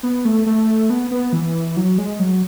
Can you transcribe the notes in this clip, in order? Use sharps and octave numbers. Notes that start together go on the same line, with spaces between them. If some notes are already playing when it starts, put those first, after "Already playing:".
B3
A3
A3
B3
B3
E3
F#3
G#3
F#3